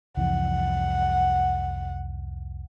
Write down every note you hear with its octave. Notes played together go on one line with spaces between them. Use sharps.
C2 F2 E3 F#5